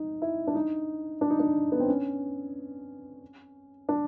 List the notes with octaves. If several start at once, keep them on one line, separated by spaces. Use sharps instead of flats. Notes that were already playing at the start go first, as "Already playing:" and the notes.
Already playing: D#4
E4
D4
D#4
D4
D#4
D4
B3
C4
C#4
D4